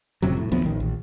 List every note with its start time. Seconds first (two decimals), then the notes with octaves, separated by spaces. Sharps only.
0.22 F#1 F2 C3 F#3
0.37 A2
0.52 D2 F3 B3
0.64 A1 D#3
0.80 A#1